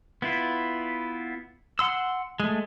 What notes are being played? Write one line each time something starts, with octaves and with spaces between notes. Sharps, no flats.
B3 E4 F4
F#5 C6 E6
G#3 A3